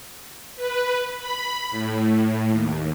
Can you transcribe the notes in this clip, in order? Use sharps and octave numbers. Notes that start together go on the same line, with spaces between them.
B4
B5
A2
D#2